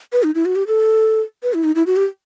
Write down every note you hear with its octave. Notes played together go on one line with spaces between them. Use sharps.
B4
D#4
E4
F#4
G4
A4
B4
E4
D#4
E4
F#4
G4